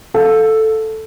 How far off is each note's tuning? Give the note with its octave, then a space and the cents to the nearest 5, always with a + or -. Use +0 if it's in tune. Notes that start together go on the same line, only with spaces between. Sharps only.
A4 +0 F5 +20